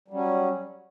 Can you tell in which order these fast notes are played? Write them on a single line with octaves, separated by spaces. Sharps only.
G3 F#3 C#4